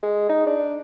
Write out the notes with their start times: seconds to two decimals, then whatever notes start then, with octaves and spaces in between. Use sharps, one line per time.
0.03 G#3
0.29 D#4
0.46 D4